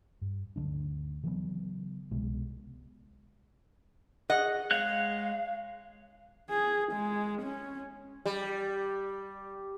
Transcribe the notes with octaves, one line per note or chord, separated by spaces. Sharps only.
G2
D2 D3 F3 D4
C#3 E3 F#3 B3
C2 B2 G#3
G#4 D#5 F#5
G#3 C#5 F5 F#6
G#4
G#3
C#4
G3